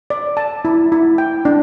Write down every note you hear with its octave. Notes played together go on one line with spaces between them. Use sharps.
D5
A5
E4
E4
G5
D4